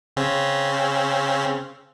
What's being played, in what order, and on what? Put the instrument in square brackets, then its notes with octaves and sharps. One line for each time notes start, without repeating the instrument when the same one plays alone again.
[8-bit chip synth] C#3 C4 C#4